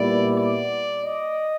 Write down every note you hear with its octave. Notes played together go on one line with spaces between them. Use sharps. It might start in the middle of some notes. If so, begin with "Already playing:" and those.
Already playing: A#2 G3 B3 E4 D5
D5
D#5